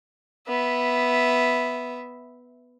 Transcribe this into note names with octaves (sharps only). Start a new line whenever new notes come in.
B3 E5